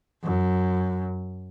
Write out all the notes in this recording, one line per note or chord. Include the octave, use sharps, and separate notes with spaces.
F#2